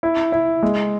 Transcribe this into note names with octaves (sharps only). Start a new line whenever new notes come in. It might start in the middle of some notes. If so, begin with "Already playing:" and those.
E4
E4
G#3